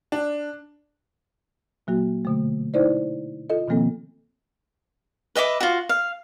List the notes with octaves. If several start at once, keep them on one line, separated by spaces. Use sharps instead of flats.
D4
A#2 F#3 A#3 F#4
B2 D3 A3
D#4 E4 C5 D5
F4 A4 D#5
B2 D#3 F3 A#3 C4 A4
B4 D#5 E5 D6
F4 F#4
F5